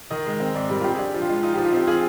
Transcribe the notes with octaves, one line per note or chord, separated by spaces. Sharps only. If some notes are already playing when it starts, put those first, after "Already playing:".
D#3 D#5
G#3
C4
G#2 D5
G3 A#4
F4
C4 G4
G#4
D4 G4
F3
F4
G#3
D#4 F4
F3 G4
F4
C4 G4
F4 G#4